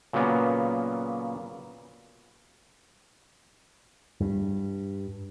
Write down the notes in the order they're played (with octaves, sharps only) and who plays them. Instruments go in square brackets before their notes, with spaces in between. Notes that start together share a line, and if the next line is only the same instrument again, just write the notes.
[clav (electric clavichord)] A#2 C#3 F#3 A#3 B3
[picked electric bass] G2